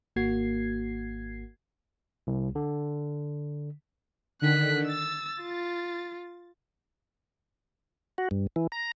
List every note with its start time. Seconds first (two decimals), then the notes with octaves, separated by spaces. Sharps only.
0.16 G#1 A#3 F#4 G#6 C7
2.27 C2
2.55 D3
4.42 D3 D#3 F#6 B6
4.88 E6 A6
5.42 F4
8.18 F#4
8.31 G2
8.56 E3
8.72 A#5